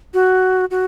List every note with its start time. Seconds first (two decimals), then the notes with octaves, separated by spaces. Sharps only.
0.14 F#4
0.71 F#4